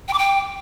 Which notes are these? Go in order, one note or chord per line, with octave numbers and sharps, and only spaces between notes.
G5
D6
G5